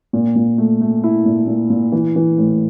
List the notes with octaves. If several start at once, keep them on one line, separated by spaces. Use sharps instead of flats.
A#2
A#2
A3
A3
E4
A#2
A#2
A#2
E3
E3
A2